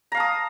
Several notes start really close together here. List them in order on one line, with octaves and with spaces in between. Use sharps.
A#5 F5 A5 D#6